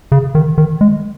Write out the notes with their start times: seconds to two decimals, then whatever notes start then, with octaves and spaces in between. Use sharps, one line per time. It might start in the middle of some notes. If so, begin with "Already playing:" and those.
0.12 C#3
0.35 D#3
0.58 D#3
0.81 G#3